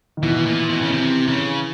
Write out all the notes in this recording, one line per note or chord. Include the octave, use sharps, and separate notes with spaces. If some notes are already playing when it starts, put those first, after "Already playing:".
D#3
B2 E3
A#2
B2
C#3
C3
C#3